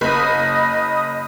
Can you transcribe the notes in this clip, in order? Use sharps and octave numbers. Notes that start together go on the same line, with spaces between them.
F#1 D#5 B5 D#6